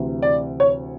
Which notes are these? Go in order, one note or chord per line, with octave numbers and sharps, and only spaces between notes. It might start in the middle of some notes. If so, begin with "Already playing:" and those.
Already playing: D2 C3 E3
D5
C#5